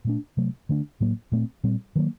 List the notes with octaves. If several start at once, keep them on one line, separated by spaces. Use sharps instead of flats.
A#2 A3 D4
C3 F#3 A3
D3 A3 D4
A2 F#3 A#3
A#2 A3 C4
A#2 G3 C4
D#3 F#3 A#3